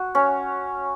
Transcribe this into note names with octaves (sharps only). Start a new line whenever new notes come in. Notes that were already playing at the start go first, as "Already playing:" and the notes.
Already playing: F#4
C#4